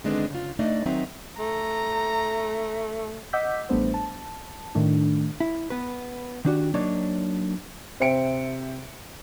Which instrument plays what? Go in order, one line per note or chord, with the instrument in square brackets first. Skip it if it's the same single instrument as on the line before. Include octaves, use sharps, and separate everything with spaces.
[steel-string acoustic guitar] D3 D#3 G#3 B3 C4 D4
C#3 F4
A3 D4 D#4 D5 D#5
D#3 F#3 C4 D#4 E5 A#5
[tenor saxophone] A3 [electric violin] A#5
[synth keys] D#5 F#5 D6 E6 G6 B6
A1 G3 A3 B3 D4 C5
A5
A2 D#3 A3 D4
[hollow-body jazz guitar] E4
B3 B4
D#3 D4 F#4 G4
F#3 A#3 D4 D#4 C#5
[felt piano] C3 C5 E5 G5 C#7 D7